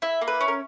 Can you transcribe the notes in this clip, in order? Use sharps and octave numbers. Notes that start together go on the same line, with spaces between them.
E4 E5
A#3
B4
C#4
A#4